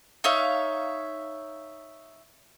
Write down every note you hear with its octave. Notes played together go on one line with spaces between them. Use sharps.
D#4 C#5 E5 F5